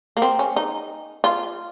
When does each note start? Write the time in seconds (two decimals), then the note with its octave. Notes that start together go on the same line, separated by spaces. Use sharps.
0.17 A#3
0.22 C4
0.39 C#4
0.56 D#4
1.24 F4